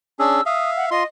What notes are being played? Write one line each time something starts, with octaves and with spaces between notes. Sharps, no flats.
C#4 D4 G#4 E6
E5 F5 D#6
F#5
F4 D#5 C6